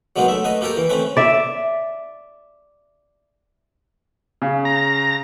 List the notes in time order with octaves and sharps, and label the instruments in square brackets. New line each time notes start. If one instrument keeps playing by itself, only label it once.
[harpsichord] F#3 G#3 A#3 B3 D#4
A3 E5
A3 B4 D#5
A#3 G4 A4 A#4 G5
E3
A3 C4 C#4 B4
[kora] D5 E5
[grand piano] C#3
[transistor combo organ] A#5